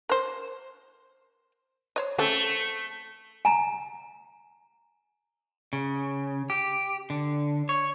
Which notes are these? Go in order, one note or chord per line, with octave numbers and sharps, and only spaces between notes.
A#4 C5
C5 C#5 D#5
A3 C4 C#4 A4
G#5 A#5
C#3
G4
D3
C#5